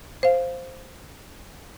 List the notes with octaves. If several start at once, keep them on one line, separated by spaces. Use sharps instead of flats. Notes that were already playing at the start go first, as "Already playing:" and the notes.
C5 F5